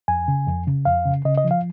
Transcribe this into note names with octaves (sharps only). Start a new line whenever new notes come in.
F2 G#5
C#3
F2
C#3
F2 F5
C#3
C#3 D#5
D#5
F3
F5